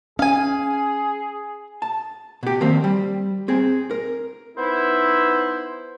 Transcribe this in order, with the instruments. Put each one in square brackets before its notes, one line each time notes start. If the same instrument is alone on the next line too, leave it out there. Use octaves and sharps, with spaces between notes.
[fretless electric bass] C#4 [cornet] G#4 [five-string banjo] F5 G#5
[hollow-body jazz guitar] A5
B2 G4
D#3 F3 A#3 C4
G3
C4 G#4
A#4
[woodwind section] B3 D#4 E4 [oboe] C5